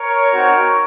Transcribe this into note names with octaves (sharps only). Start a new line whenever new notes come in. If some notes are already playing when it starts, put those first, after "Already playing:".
Already playing: A#4 C#5
C4 D#4 F#4